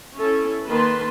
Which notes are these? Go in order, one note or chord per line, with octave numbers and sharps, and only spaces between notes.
C#4 E4 A4
D#3 A#3 B4 A5 B5 C6